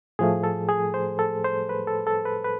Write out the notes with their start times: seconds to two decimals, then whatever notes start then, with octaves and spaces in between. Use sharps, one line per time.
0.19 A2 F3 A3 G#4
0.44 A4
0.69 G#4
0.94 C5
1.19 A4
1.44 C5
1.69 B4
1.87 A4
2.07 A4
2.25 B4
2.45 B4